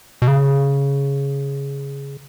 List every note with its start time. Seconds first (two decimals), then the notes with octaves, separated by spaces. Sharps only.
0.22 B2
0.28 C#3